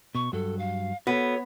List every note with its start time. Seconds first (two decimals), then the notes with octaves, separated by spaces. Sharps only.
0.15 B2 C#6
0.33 G2 F#3 A4
0.59 F5
1.07 B3 F#4 A4 C#5